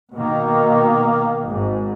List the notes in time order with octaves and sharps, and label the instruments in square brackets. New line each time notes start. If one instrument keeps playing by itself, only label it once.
[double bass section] B2 D#3 [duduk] A#3
[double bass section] G#1 G#2